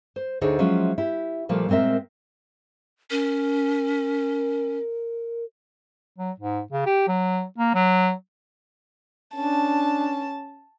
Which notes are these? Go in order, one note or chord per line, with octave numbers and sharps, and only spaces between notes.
C5
D2 D3 D#4 G#4 C5 C#5
F3 F#3 G#3 C#4 F4 E5
E4 G4
A#2 F3 G3 A3 A#3
A#2 G#3 C4 A#4 E5
C#4 A#4
F#3
G#2
C#3
G4
F#3
A#3
F#3
C#4 D4 A5